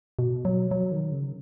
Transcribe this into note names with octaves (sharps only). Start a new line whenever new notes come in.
B2
F#3
F#3
D#3
C#3